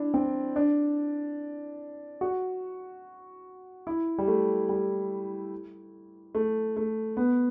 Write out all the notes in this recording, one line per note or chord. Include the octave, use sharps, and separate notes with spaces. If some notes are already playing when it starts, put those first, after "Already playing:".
Already playing: D4 E4
C4
D4
F#4
E4
G3
A3
G3
A3
A3
B3